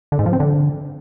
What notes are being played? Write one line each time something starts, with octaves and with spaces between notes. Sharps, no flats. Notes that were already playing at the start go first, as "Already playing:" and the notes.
D3
G#2
F3
C4
D3